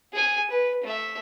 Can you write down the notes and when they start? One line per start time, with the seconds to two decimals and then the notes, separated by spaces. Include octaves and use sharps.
0.13 G#4 G#5
0.50 B4
0.84 A3 E5